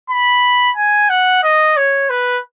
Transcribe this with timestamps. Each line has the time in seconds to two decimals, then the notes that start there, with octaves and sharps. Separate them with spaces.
0.10 B5
0.76 G#5
1.10 F#5
1.43 D#5
1.77 C#5
2.10 B4